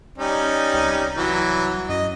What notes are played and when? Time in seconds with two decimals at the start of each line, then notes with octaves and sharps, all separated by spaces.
0.18 G3 C#4 D#4
0.74 C2
1.16 E3 F#3
1.89 F#2 D#5